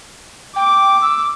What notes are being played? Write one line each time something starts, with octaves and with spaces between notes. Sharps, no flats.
G5 D6
E6